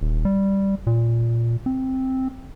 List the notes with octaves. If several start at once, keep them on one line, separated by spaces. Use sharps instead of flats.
D#1
G3
A#2
C4